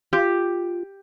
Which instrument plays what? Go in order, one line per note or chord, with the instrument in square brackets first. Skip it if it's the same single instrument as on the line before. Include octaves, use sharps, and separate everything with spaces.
[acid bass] F4 [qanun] G4